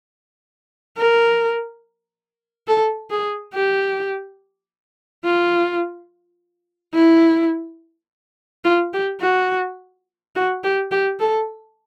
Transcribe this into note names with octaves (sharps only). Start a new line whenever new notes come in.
A#4
A4
G#4
G4
F4
E4
F4
G4
F#4
F#4
G4
G4
A4